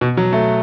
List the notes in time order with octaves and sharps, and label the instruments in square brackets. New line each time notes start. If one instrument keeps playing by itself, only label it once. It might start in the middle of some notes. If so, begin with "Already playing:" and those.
[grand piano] B2
F#3
A3